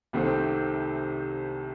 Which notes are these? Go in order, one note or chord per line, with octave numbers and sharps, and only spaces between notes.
C2 C3 D#3 A3 C4